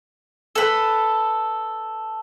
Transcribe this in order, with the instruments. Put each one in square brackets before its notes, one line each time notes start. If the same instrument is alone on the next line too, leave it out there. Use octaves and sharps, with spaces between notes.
[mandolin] A4 B4